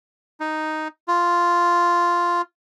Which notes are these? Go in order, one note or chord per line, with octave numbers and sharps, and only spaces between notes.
D#4
F4